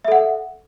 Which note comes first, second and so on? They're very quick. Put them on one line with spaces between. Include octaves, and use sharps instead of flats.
E5 A4 F#5